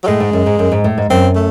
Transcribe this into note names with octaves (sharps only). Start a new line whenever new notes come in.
F#3
A2 G#3
G#2
F#2
G#2
F#2
G#2
A2
G#2
F#2 C4
A3